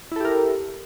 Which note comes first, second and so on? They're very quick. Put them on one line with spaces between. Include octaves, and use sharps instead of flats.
E4 A4 G4 A#4